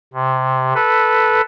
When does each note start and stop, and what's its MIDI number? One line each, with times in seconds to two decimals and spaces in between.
0.14 0.74 48
0.75 1.41 69
0.75 1.41 71